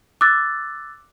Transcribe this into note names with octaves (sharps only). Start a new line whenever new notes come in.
D6 E6 F#6 A6